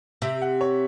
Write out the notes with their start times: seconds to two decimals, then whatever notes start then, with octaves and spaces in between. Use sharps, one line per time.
0.22 C3 E5
0.42 F#5
0.61 C#5